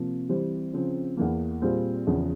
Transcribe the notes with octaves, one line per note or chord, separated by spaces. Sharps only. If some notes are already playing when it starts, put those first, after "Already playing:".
Already playing: C3 F3 A#3
E3 G3 C4 G4 C5
C#3 F3 C4
E2 E3 A#3
A#2 G3 C4 F4 G#4
E2 C#3 F3